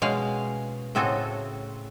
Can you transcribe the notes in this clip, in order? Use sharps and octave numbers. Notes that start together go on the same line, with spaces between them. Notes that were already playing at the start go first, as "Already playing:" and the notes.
B2 G#3 C#4 F5
A2 C#3 C4 F#4 A4 D#5